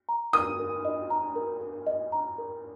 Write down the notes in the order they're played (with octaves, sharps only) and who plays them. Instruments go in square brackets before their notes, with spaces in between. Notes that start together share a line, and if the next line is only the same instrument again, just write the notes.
[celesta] A#5
[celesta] A#4 [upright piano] D#6
[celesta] A#4
D#5
A#5
A#4
A#4
D#5
A#5
A#4